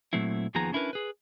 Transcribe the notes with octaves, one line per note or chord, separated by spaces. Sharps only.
A#2 F#3 A3 C4 E4
D#2 D#3 F3 B3 G#4 A#5
C#4 D4 E4 G4 A#4 B4
G#4 B4